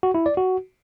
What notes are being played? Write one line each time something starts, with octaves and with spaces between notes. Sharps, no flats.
F#4
E4
D5
F#4